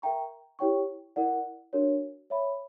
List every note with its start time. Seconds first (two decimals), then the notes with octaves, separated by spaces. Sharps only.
0.02 A#4 E5 G5 A#5 C#6
0.59 E4 G4 C#5 G5 C#6
1.16 E4 A#4 D5 F#5
1.73 D4 F#4 A#4 C#5
2.30 C#5 E5 B5